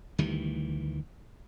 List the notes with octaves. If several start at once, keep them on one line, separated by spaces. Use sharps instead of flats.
D2 D#3 E3 G3